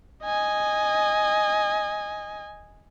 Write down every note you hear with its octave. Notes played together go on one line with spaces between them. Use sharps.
D#5 G#5